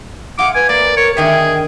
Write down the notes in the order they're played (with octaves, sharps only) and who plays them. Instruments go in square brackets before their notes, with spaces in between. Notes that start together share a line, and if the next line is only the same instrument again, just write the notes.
[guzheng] F4 G#4 [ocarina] F#5 [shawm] D6
[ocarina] B4 [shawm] G#5
[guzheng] A#3 [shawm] D5
[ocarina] A#4 [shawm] C#5
[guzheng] D3 D#3 E5 [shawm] G#4 [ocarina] G5